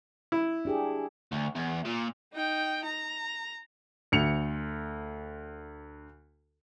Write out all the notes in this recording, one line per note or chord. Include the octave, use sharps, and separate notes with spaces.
E4
D4 G4 G#4
D2
E2
A#2
D#4 G5
A#5
D2 C#7 F7